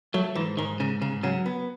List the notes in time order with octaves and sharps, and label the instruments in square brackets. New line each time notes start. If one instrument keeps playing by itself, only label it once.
[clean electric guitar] F#3 [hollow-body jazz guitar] A3
[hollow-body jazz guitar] G#2 [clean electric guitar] E3
[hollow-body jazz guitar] G#2 [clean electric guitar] D#3
[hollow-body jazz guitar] G#2 [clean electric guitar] C#3
[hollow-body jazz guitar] G#2 [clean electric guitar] C#3
[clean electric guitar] C#3 [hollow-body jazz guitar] F#3
[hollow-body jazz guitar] B3